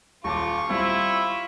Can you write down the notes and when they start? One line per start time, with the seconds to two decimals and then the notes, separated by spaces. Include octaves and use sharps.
0.24 D#1 F4 A5 C#6 D6
0.69 G3 C4 E4 F4